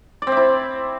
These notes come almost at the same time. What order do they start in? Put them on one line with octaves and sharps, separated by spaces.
D5 C4 E5 E4